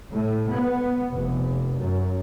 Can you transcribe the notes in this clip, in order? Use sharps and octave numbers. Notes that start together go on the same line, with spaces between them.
A2
B3
F1
F#2